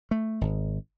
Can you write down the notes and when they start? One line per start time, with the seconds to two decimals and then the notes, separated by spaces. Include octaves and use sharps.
0.11 A3
0.41 G#1